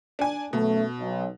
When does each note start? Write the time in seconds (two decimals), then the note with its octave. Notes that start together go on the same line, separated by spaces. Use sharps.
0.19 D4 G#5
0.53 F#2 B2 A3
1.00 B1